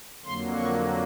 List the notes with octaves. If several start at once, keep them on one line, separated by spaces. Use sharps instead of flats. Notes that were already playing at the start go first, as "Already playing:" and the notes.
F2 D3 F#3 A#3 C6
C#6